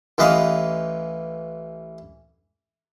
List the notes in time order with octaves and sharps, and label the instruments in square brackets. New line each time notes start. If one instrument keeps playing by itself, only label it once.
[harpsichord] A1 E3 B4 D#5 F5